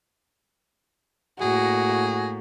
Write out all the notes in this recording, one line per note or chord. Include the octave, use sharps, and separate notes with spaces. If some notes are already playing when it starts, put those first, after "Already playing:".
A2 A#3 F#4 G#4